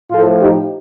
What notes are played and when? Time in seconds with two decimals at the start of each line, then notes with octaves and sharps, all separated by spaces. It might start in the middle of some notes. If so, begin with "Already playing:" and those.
0.11 A2 F3 F4 A4
0.40 D#4 G4